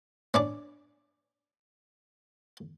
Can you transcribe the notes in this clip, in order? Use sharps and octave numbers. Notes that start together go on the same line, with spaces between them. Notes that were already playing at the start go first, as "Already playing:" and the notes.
C#4 D4 D5